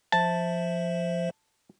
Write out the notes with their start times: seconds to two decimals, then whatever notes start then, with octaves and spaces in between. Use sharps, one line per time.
0.12 F3 C5 E5 A5